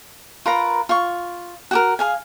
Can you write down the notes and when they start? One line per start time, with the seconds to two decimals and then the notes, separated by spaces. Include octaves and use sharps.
0.46 F4 A#4 B4 A#5
0.89 F4 C#6
1.71 F#4 G4 A#4
1.99 G#4 F5 G#5